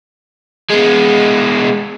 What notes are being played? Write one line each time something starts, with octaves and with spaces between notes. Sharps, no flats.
G#3 B3